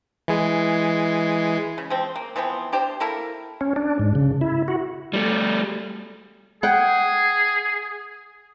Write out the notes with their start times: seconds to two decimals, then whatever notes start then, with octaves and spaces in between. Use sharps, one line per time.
0.28 E3 G#3 G#4
1.78 C#3
1.90 F3 C4
2.16 A#3
2.36 E3 F3 B3 C4
2.73 D4 G4 C5
3.00 A#3 E4 A4 A#4
3.61 C#4
3.76 D4
3.99 G#2
4.15 C#3
4.41 E4
4.68 F#4
5.13 G3 A3
6.63 G#4 F#5 G5